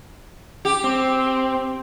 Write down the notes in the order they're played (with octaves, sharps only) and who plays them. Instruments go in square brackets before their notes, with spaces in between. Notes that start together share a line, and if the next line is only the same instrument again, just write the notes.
[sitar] G4
[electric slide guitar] C4